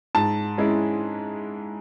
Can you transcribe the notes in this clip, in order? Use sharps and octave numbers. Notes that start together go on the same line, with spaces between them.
G#2 A5
G#3 C#4 E4